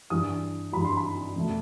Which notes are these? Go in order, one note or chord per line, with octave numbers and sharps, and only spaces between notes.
G2 E3 G3 D#6
G2 E3 G3 B5
C6
B5
E2 B2 A3 E4